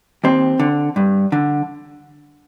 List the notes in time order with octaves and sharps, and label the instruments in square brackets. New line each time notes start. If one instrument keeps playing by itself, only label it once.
[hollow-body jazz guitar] D#2 C4
D3
G2
D3